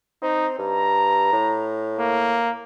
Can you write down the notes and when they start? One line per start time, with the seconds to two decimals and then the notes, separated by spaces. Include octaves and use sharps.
0.22 C4 D#4
0.59 G2 A#5
1.32 A2
1.99 A#3